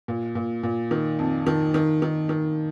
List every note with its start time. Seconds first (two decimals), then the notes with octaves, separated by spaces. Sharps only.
0.08 A#2
0.35 A#2
0.63 A#2
0.91 D#3
1.19 F2
1.47 D#3
1.74 D#3
2.02 D#3
2.29 D#3